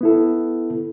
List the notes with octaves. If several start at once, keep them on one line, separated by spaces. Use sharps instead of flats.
B3 E4 A4